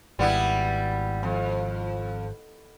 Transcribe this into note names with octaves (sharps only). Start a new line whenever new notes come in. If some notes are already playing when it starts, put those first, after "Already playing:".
G#1 G3 B3 E4
F2